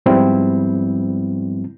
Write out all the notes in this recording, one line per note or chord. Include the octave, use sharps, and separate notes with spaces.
G#2 F3 G3 B3 C4 E4